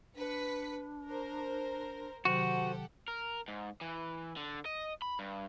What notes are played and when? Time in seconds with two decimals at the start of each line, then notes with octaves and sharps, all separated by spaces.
0.16 D4 B4 B6 C#7
1.07 A#4 C5
2.25 C3 D#3 F#3 F#4 G4 A4 C5 F#5
3.08 A#4
3.48 G#2
3.81 E3
4.37 D3
4.66 D#5
5.02 B5
5.19 G2